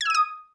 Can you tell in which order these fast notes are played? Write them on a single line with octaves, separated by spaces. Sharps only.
G#6 E6 D#7 D#6